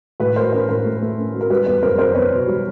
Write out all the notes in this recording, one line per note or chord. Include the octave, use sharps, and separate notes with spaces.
A2 B4
F#3 A#4 C5
C#4 A#4
A2 A#4
A3
A3
C#4
F#3
A#4
G3 B4
E2 B4
F#1 A#4 C5
F#1 A#4 C5
E2 B4 C#5
B2
G3